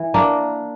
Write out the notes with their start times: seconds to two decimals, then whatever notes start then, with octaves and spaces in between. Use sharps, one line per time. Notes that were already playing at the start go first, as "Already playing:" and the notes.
Already playing: E3
0.14 A#3 D4